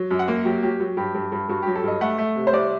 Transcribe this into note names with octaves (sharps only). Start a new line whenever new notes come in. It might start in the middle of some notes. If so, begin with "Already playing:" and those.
Already playing: F#3
F#2
F#5
A#3
F#3 G4
F#3 G4
F#3
G2 G4
G2
G2
G2 F#4
F#3 G4
A4
G2 D#5
A3 F#5
A3
C3
C5
C2 D5